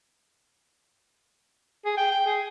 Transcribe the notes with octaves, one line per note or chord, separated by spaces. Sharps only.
G#4
G5
G5
G#4